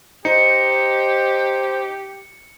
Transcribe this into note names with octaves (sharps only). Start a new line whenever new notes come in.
D#4 G4 C5 C#7